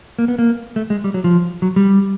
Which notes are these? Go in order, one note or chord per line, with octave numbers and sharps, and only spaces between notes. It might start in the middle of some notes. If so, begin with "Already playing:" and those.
A#3
B3
A#3
A3
G#3
G3
F#3
F3
F#3
G3